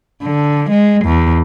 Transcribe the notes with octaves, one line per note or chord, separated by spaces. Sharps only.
D3
G#3
E2